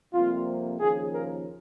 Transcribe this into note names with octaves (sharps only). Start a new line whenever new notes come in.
F2 C3 G3 A#3 F4
D#2 C#3 F3 G#4
A#4